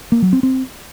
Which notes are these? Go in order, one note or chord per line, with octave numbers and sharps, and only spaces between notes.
A#3
F#3
C4
C4